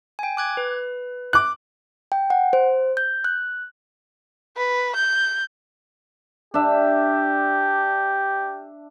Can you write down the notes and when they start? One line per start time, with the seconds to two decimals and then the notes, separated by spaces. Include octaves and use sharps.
0.19 G5 G#5
0.37 D6 F#6 G#6
0.57 B4
1.33 D6 F#6
2.12 G5
2.30 F#5
2.53 C5
2.97 G6
3.24 F#6
4.57 B4
4.95 G6
6.54 D4 G4 E5